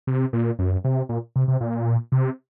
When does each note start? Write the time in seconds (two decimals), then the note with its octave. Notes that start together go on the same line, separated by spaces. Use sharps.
0.07 C3
0.33 A#2
0.59 F#2
0.84 C3
1.09 A#2
1.36 C3
1.48 C3
1.61 A#2
2.12 C3